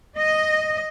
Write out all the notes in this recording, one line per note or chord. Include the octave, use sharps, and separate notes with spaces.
D#5